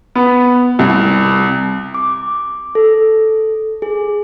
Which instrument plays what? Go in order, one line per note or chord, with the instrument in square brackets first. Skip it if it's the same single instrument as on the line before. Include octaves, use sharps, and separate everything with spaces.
[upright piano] B3
C2
[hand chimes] D6
A4
G#4